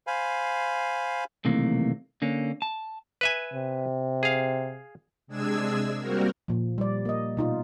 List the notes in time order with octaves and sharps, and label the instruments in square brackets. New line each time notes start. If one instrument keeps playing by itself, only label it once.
[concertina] C5 F5 G#5 B5
[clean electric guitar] B1 C3 D#3 E3 A3 A#3
D3 A#3 C#4
A5
[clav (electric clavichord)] B4 E5 G#5
[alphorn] C3
[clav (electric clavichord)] G#4 F5
[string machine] C3 G#3 D4 G#4 G#5 E6
G3 A#3 C4 F#4 A#4
[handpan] A#2 F3
G3 D5
A#3 D#5
B2 D#4 F4